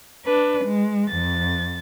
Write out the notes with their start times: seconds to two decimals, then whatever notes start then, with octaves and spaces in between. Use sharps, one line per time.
0.24 D4 B4
0.65 G#3
1.08 F2 A6